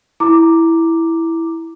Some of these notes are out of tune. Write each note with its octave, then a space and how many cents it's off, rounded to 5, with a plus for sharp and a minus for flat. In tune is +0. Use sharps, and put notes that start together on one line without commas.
E4 +0 A#5 +0 D6 +0